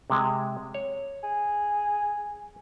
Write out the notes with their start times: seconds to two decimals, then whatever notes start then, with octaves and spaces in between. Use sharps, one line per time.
0.10 C3 G#3
0.74 C#5
1.23 G#4